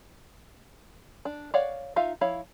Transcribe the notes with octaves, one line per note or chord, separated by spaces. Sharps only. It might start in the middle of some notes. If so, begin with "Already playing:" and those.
D4
C#5 D5 F5 F#5
D#4 F4 E5 F5
F3 E4 C#5 F5 B5